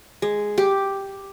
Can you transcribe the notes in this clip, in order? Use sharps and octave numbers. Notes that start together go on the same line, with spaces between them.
G#3
G4